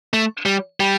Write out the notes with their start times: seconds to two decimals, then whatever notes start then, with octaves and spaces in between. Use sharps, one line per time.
0.13 A3
0.46 G3
0.80 G3